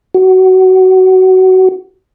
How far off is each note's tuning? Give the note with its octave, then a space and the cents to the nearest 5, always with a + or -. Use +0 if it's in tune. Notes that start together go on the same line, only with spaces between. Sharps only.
F#4 +20